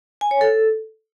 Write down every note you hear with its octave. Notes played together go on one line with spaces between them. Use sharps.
G#5
C#5
A4